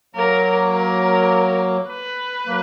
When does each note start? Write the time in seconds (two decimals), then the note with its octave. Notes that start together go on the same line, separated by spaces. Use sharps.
0.15 F#3 A#3 A#4
0.73 A#4
1.89 B4
2.47 F#3 A#3